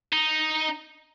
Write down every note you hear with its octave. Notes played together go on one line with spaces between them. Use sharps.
D#4